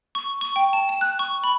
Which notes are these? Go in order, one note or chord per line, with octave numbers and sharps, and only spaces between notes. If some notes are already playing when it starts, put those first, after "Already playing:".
C#6
C#6
G5
A5
E7
F#6
C#6
B5